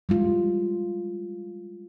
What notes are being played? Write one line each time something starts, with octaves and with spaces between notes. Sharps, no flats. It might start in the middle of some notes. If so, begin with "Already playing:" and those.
G3 G#3 F4